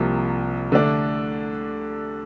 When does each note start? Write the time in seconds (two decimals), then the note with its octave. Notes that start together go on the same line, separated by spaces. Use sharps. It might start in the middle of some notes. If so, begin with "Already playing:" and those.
Already playing: C2 C3 F3 A#3
0.72 D3 A3 D4